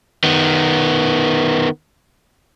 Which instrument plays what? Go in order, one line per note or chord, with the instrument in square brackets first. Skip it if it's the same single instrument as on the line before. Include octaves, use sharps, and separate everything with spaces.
[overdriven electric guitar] D#3 B3